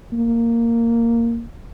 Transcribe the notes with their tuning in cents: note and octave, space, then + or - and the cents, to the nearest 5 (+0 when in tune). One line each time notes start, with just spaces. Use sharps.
A#3 -10